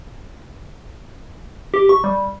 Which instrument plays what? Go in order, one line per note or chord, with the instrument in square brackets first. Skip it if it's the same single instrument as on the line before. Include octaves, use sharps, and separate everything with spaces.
[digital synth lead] G4
C#6
G3